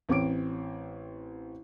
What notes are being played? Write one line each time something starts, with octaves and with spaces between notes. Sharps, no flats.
A1 C4 C#5 D6 D7